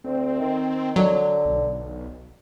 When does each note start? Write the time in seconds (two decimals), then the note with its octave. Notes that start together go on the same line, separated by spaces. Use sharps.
0.04 D2 C4
0.40 D#3
0.96 D3 F#3
1.45 B1